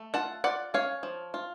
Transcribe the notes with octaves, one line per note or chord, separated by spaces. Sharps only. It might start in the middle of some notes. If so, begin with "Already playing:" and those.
Already playing: A3
F4 F#5 A5
F4 D5 F#5
C#4 C#5 F5
F3
F4